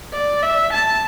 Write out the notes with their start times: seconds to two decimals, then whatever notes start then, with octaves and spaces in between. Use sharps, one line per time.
0.13 D5
0.43 E5
0.73 A5